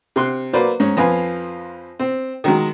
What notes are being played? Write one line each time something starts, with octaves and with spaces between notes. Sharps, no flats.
C3 C6 F#6
F#3 A#3 B4 C5 D5
G#2 C#4
F2 F3 B4 F5 G#5
C4
D#3 F#3 G#3